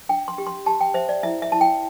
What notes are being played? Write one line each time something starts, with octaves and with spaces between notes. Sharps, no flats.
D4 G5
C6
G4
C6
G4 A5
G5
C5 E5
D5
E4 E5
E5
E4 A5
G5